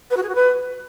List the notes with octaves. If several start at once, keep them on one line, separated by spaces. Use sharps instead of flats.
B4
F#4
G#4
F#4
B4